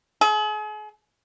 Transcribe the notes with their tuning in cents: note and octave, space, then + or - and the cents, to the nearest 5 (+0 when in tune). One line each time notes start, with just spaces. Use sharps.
G#4 +40